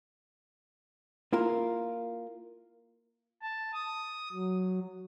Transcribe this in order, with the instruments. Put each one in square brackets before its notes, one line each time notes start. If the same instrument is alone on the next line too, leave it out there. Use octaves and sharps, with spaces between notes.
[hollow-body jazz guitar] A#3 E4 F4 A#4
[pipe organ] A5
D#6
F#3